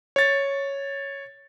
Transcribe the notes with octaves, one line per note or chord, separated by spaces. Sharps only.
C#5 A6